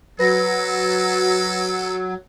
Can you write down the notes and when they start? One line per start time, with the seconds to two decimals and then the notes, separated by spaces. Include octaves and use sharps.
0.19 F#3 A4 B4 A#6